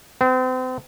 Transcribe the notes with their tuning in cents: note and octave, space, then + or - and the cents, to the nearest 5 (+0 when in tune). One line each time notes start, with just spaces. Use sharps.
C4 -35